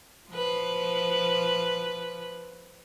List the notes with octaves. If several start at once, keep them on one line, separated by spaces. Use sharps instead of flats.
F3 B4